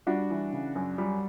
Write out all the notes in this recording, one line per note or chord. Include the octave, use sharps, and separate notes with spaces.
G3 D4 F#4
E3
C#3
F#2
G3